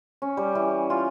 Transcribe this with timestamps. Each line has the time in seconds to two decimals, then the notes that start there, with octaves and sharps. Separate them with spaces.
0.22 C#4
0.37 G3
0.55 E3
0.90 F4